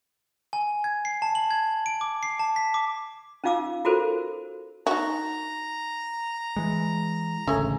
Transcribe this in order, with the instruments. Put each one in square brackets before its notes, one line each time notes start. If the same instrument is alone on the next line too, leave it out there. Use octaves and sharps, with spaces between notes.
[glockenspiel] G#5
G#6
C7
A5
F#7
G#6
D7
D6
C7
A5
B6
D6
[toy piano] C#4 D#4 F4 F5 D6 E6
F4 F#4 A4 A#4 C5
[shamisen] D#4 F#4 [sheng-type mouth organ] A#5
[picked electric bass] E3 G#3
[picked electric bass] A1 D2 C#3 [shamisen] A3 C#4